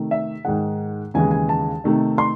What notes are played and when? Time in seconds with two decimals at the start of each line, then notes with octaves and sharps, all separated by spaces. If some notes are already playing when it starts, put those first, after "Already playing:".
Already playing: C3 D#3 A3
0.11 E5
0.45 G#2 D#3 G#3 F#5
1.14 D#2 C#3 E3 G#3 G#5
1.31 G#5
1.49 A5
1.84 C3 D#3 A3 D#4
2.18 C6